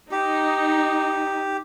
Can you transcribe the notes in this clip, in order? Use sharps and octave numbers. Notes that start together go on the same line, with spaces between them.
D#4 G4